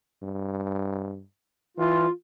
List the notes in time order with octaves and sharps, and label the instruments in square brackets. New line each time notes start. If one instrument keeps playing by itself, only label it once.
[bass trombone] G2
[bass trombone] E3 [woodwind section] F4